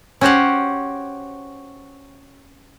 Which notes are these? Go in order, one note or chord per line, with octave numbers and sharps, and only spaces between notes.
C#4 F#4 G4 C5 C#5 F#5